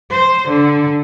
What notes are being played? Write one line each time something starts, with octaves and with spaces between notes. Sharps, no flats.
C5
D3